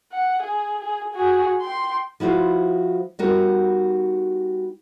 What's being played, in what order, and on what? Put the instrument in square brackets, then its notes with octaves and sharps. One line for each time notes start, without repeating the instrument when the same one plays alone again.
[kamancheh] F#5
G#4
G#4
F#4 G#4
G5 C6
[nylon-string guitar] F3 E4 F#4 B4 C5
G3 B3 D#4 F#4 A#4